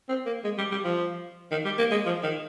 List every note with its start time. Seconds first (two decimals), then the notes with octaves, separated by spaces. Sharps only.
0.09 C4
0.26 A#3
0.44 G#3
0.58 G3
0.71 G3
0.84 F3
1.51 D#3
1.65 G3
1.79 A#3
1.92 G#3
2.06 F3
2.23 D#3